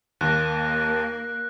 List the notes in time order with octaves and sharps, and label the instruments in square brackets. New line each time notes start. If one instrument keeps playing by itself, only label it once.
[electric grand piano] D#2 [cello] A#3 [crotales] F#6 A#6